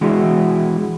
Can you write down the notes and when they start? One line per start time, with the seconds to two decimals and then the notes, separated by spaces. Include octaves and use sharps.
0.01 E3 G#3 D4 E4 F#4